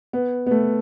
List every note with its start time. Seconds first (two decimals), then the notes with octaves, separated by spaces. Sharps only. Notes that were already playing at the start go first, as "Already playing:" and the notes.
0.13 B3
0.46 B3
0.51 A3